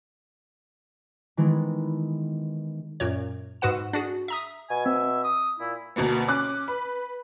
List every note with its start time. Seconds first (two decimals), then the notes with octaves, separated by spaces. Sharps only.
1.37 D#3 E3 G#3 B3 E4
3.00 F#2 A#2 C#5
3.61 G#2 F#4 B4 F#5 E7
3.93 D4 F#4 G#4
4.28 E5 A#5 D#6
4.70 B2 G#5
4.86 C4 E5
5.24 D#6
5.60 A#2 E4
5.96 D2 B2 A#3 B3
6.28 C#4 D6 F#6
6.68 B4